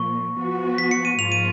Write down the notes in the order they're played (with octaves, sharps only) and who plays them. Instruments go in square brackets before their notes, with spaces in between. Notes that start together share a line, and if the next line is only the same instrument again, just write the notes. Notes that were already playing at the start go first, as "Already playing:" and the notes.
Already playing: [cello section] A#2 F3 A#3 [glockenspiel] C#6
[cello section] F3 B3 F#4
[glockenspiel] B6
C#7
D#7
[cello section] G#2 F3 A#3 F4 [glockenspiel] F7
[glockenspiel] D#7